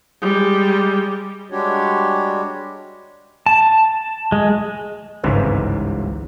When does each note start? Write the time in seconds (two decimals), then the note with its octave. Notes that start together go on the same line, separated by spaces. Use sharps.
0.21 G3 G#3
1.51 G3 G#3 D4 F#4 G4 C#5
3.46 A5
4.32 G#3
5.23 G1 C#2 G#2 C3 E3